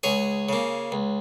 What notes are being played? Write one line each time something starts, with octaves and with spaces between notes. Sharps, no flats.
C#2 G#4 C#5
C#3 A#3
C#2